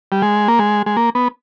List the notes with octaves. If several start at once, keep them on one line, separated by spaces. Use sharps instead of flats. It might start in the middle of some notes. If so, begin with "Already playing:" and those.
G3
G#3
A#3
G#3
G#3
A#3
B3